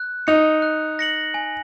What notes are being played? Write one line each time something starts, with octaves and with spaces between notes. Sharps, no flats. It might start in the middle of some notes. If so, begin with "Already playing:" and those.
Already playing: F#6
D#4 C#7 F7
F#6
A#6 C#7 F#7
G#5